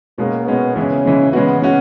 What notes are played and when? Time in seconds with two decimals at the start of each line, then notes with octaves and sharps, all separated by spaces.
0.18 B2 G#3 A#3 C#4
0.47 B2 G#3 B3 C#4
0.76 C#3 E3 G#3 C#4
1.05 C#3 E3 G#3
1.33 C#3 G#3 B3 C#4 F#4
1.62 C#3 G#3 C#4 F#4